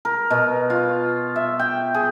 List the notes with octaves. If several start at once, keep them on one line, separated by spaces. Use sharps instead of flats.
A#4
B2
F4
E5
G5
G#4